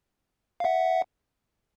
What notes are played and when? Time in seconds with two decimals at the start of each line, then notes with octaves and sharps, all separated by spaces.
0.60 F5
0.64 E5 F#5